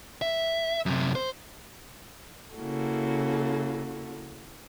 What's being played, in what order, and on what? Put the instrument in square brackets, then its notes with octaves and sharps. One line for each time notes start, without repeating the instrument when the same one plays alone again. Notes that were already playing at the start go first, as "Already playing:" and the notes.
[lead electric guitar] E5
F#2 C3
C5
[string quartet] C#3 A#3 E4 F#4 A4